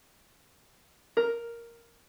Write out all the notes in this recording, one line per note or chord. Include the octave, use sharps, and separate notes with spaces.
A#4